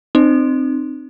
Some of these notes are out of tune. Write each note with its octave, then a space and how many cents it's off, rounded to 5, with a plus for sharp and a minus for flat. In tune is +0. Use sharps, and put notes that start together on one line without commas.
C4 +0 D#4 -35